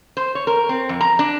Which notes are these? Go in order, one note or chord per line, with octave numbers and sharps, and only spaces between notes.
C5
C#5
A#4
C4
F2
A#5
D4